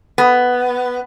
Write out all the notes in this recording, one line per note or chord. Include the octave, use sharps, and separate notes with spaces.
B3